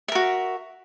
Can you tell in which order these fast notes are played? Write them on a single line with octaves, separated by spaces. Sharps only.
E5 A#4 F#4